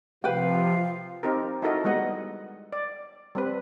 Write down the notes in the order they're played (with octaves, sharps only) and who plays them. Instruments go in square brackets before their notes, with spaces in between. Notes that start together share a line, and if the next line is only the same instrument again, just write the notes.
[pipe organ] C3 F3 [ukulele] B4 G5 [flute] F5
[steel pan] C4 D#4 G4 A#4
D#4 E4 F#4 A4 A#4 D#5
G3 G#3 B3 D#5 F#5
D5
G3 C4 B4